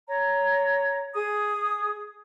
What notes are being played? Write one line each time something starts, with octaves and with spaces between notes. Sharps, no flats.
C#5 A#5
G#4 D#6